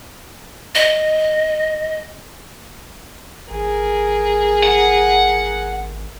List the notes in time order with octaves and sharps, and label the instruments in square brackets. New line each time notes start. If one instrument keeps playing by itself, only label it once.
[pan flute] D#5
[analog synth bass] G#1 [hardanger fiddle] G#4 A#4
[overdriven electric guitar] F#5